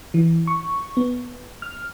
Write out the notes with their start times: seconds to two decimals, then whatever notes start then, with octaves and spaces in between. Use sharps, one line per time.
0.14 E3
0.47 C#6
0.97 B3
1.62 F6